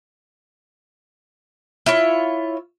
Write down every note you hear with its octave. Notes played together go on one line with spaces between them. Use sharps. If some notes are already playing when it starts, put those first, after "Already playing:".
E4 F4 C#5